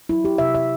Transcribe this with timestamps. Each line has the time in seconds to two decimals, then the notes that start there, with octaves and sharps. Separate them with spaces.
0.09 F#3 E4
0.25 G4
0.38 C3 E5
0.55 E5